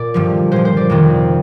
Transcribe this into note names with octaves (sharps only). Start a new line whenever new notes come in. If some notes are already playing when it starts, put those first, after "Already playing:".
Already playing: A#2 D5
G2 D3 F3
A#2 F3 C5
C5
D5
F2 C3 D#3 C5